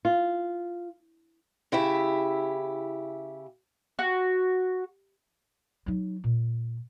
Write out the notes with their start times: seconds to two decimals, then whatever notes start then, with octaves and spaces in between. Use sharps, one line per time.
0.05 F4
1.72 C#3 E4 G4 E5
3.99 F#4
5.86 F#3 D#4
6.24 A#2